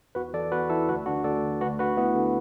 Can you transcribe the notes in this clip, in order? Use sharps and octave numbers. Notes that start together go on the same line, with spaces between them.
E2 F#4 B4
E3 A4 D5
E2 F#4 B4
E3 E4 A4
D2 F#4 B4
D3 D4 F#4
D2 A4 D5
D3
D2 F#4 B4
D3 F#4 B4
D2 B3 E4
D3